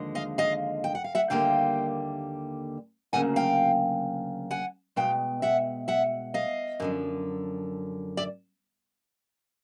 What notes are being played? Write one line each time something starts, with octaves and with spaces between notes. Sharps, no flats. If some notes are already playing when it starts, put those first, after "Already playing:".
Already playing: D#2 D3 F3 G#3
D#5 F5
D#5 F5
G5
F#5
F5
E5 F#5
D#2 D3 G3 A#3 F5 G5
D2 C#3 F#3 A#3 F#5 G#5
F5 G5
F#5 G#5
B2 G#3 F5 G5
E5 F#5
E5 F#5
D#5 F5
F#2 D3 F3
D5 E5